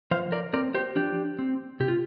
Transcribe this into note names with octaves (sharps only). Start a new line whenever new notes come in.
F3 C5 F5
A#4 D5
C4 A#4 D5
G4 C5
F3 D4 G4
C4
C3 G4
F4